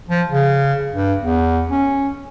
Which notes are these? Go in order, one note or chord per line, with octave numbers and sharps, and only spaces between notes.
F3
C#3
G2
E2
C#4